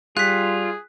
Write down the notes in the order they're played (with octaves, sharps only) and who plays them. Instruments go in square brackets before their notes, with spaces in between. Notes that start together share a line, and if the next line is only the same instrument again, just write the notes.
[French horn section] G3 [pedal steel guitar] F4 [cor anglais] G#4 [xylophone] F#6 B6